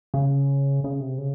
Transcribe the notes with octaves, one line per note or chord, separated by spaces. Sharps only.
C#3
C#3
C3
C#3